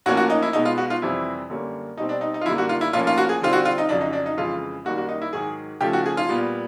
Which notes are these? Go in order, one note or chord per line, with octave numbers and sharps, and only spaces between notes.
A2 F3 A#3 C#4 F#4
F#4
D#4
E4
B2 G#3 B3 D#4
F4
F#4
F4
F2 C3 E3 G3 C4 E4
F#2 D3 G3 A#3 C#4
B2 G3 C4 D#4
D4
D#4
D#4
F4
F#2 D3 G3 A#3 E4
F#4
F4
E4
A2 F3 A#3 C#4 F4
F4
F#4
G#4
D3 G3 C4 F4
F#4
F4
D#4
F2 C#3 F#3 D4
D#4
D4
D#4
F2 C#3 E3 G#3 F4
F#2 D#3 G3 A#3 F#4
F#4
D#4
E4
G#2 D#3 F#3 G#4
C#3 F3 A3 G4
F#4
G#4
F4
A#2 G3 B3